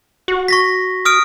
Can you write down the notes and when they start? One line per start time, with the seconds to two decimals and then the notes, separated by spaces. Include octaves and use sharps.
0.28 F#4
0.48 C#6 A#6 B6
1.05 D#6 F6 D7